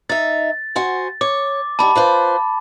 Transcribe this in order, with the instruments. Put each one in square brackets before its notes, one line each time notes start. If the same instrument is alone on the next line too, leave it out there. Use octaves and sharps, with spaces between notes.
[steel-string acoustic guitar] D#4 E5 [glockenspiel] A6
[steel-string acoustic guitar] F#4 C5 G#5
[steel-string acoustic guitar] C#5 [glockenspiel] D6
[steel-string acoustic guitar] D#3 G3 E4 [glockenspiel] A5 B5 D6
[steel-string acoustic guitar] F4 B4 C5